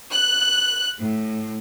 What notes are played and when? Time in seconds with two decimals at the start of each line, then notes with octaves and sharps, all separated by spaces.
0.11 F#6
0.98 A2